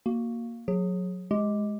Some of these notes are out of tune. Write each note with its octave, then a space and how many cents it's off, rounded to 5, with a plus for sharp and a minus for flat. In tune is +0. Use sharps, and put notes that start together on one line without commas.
A#3 +0 F#4 +0
F#3 -25 G#4 +0
G#3 +10 G4 +0